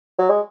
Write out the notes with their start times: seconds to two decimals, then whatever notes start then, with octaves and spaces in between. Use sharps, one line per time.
0.19 F#3
0.29 G#3